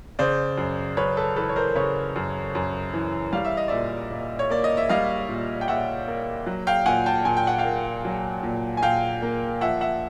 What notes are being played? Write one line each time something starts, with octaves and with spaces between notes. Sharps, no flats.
C#3 C5 D5
F#2
F#2 B4 C#5
A4 B4
E3 A4 B4
C#5
A#4 C5
C#3 B4 C#5
F#2
F#2
E3
G3 F5
E5
D#5
A#2 D5 E5
A#2
C#5
A#3 D5
D#5
E5
G3 D#5 F5
A#2
G5
A#2 E5 F#5
A#3
F#3
F5 G5
A#2 F#5 G#5
G5 A5
A#2 G#5
G5
F#5
F5 G5
A#3
F#3
A#2
G#5
A#2 F5 G5
A#3
F3 E5 F#5
E5 F#5